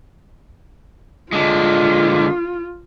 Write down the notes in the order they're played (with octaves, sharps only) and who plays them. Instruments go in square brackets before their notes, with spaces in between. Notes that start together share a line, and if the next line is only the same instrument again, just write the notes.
[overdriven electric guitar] D3 G#3 [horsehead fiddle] F4